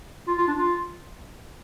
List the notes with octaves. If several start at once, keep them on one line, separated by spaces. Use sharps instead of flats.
F4
F4
D4
F4